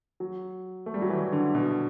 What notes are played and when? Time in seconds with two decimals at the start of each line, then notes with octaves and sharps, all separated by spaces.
0.20 F#3
0.86 A3
0.94 G3
1.02 F#3
1.10 E3
1.32 D3
1.55 B2